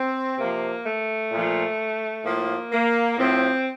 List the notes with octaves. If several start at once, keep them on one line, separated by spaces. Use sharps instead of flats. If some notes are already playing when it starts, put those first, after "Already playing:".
Already playing: C4
C3 F3 A#3
A3
A#2 F3
A2 F3 A#3
A#3
A2 F3 C4